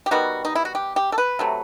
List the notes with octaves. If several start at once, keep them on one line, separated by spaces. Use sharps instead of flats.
G4
D#3 G3 B3 F#4
D#4
E4
F#4
G4
G4
A4
B4
C3 F#3 A3